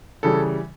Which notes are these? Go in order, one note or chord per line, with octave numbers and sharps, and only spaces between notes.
C#3 E3 G3 A4